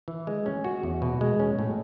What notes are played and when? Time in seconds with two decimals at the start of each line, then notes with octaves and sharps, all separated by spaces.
0.08 E3
0.27 G#3
0.46 C#4
0.64 F#4
0.83 E2
1.02 B2
1.21 G#3
1.40 C#4
1.59 A2